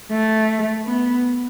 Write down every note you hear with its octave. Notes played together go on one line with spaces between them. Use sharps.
A3
B3